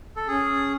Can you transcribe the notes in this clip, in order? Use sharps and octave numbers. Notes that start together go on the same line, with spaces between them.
A4
C#4 G#4